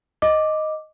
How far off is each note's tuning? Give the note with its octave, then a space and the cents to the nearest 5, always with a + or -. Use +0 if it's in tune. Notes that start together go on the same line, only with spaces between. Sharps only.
D#5 +0 D6 +0